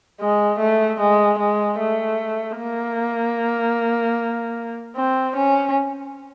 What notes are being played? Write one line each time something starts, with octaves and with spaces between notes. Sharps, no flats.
G#3
A3
G#3
G#3
A3
A#3
C4
C#4